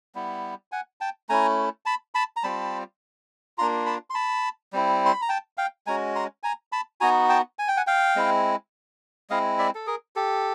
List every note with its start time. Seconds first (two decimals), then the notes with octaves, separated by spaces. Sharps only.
0.15 G3 B3 E4
0.72 F#5 G#5
1.01 G5 A5
1.29 A3 C#4 E4 G#5 A#5
1.86 A5 B5
2.15 A5 B5
2.36 A#5
2.43 G3 C4 F4 A5 B5
3.58 A#3 D4 F4 A#5 C6
3.86 A5 B5
4.10 C6
4.15 A5 B5
4.73 G3 C4 E4
5.06 C6
5.13 B5
5.22 A#5
5.29 G5 A5
5.57 F5 G5
5.87 G#3 C#4 F#4 G#5 A#5
6.15 A#5 C6
6.43 G#5 A#5
6.72 A5 B5
7.01 B3 D#4 F#4 G#5 A#5
7.29 G5 A5
7.59 G#5
7.68 G5
7.77 F#5 G#5
7.87 F5 G5
8.16 G#3 C4 E4
9.30 G#3 C4 E4 D#5 F5
9.59 D5 E5
9.75 A4
9.87 G#4 A#4
10.16 G4 A4